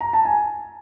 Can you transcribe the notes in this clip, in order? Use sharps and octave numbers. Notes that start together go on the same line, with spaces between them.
A#5
A5
G#5